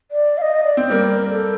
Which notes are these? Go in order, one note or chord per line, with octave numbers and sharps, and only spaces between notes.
D5
F5
D#5
D5
C4
G3 A#3 A#4
A4